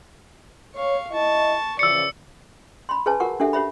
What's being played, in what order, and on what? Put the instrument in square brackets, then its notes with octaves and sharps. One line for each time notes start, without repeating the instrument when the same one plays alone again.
[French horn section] C#5 [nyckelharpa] F5 C#6
[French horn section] E4 D#5 [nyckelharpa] A5 C#6
[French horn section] C#3 E3 F3 [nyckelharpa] D5 [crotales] E6 C#7
[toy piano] B5 C6
G#4 B4 C#5 G#5 A5
F#4 A#4 F#5 C#6
D4 G4 A4 E5
G4 C#5 E5 B5